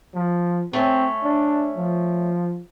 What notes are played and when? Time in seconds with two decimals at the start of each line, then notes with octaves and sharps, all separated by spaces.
0.14 F3
0.73 A3 C4 C#4
1.23 D4
1.76 F3